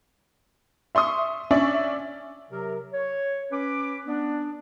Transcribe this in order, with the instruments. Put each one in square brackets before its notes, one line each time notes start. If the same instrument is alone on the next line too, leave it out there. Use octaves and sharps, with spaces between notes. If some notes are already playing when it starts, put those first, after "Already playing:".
[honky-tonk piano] E5 C6 C#6 D#6
C#4 D4 D5 E5 C#6
[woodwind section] C3 F#3 A#4
C#5
C#4 B4 D6
B3 D4